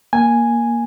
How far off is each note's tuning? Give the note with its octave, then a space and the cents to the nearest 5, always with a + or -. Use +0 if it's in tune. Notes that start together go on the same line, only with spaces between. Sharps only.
A#3 +10 G#5 +0